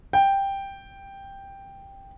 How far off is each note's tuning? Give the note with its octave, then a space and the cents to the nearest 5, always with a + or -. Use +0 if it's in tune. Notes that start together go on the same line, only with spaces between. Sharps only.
G5 +5